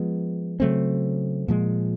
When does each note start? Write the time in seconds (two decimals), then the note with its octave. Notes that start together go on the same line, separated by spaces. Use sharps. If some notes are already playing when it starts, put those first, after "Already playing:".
Already playing: F3 G#3 B3
0.60 C#3 F#3 A3 C4
1.48 A#2 F3 G#3